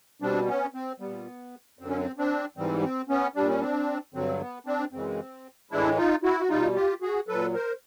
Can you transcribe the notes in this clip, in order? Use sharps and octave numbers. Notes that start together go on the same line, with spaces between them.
B2 G3 C4 D4
B3 C#4
C4
A#2 G3 B3
F#2 D3 F#3 C4
C#4
C4
C4 D4
G#2 E3 G3 C4
C4
B3 C#4
A#2 G3 D4
C#4
C4 D4
G2 D3 F#3 C4
B3
C4 D4
F#2 C#3 E3 G#3 C4
A2 E3 G#3 D4 E4
D#4 F4
E4 F#4
F#4
B2 G3 D#4 F4
F4 G4
F#4 G#4
A#2 F#3 A4 B4
A#4 C5